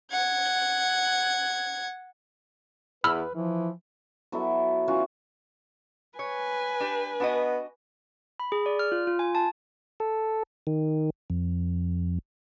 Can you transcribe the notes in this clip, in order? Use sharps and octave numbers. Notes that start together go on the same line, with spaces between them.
F#5 G#6
E2 B4 B5 E6 F6
E3 F3
F#3 B3 E4 A4
E3 C#4 F4 F#4
B4 C#5 G#5
D4 G4
B3 D4 F#4 D#5
B5
G#4
D5
F6
F4
F4
G#5
A5
A4
D#3
F2